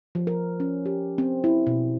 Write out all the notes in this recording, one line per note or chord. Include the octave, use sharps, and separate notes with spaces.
F3
A#4
C#4
G4
C4
E4
B2